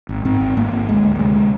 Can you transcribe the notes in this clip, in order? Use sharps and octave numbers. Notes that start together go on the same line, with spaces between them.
G#1
G#2 C4
G#1
G#1 A#3
G#1
D2 G#3
D2
G3
C3 G#3
C3